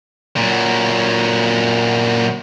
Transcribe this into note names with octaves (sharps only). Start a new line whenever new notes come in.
A#2 F#3